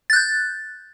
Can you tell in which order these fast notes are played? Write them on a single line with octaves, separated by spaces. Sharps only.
A6 F#6 G6